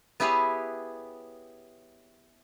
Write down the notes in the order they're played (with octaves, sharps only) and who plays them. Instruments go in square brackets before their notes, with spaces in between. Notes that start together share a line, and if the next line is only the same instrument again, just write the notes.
[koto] B3 E4 G4 G#4 B4 C#5